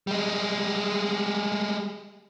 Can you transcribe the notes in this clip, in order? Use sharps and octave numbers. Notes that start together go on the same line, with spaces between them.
G3 G#3